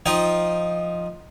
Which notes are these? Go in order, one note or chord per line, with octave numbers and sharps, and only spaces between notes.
F3 D#4 G5